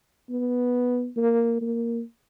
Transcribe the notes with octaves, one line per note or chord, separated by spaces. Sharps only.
B3
A#3
A#3